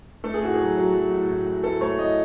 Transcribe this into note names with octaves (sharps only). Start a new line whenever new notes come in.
A3 A4
G#4
A2 F#4
F#3 G#4
F#3
F#3
A2
A2
A2
A2 A4
A3 C#5
A2 D#5